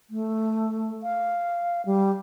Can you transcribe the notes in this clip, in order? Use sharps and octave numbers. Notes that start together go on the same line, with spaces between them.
A3
F5
G3